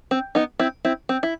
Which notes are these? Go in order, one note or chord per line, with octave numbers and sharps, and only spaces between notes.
C4
B3 D#4
C4 E4
C4 E4
C4
E4